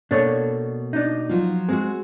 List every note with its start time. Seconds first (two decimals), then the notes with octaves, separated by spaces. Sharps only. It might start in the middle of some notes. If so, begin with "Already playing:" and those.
0.11 B2 A#3 D4 A4 C#5
0.93 D4 D#4
1.29 F3 F#3 F4
1.69 G#3 C4 F#4